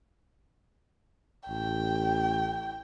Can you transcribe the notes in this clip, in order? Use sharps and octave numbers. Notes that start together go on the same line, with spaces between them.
A1 G5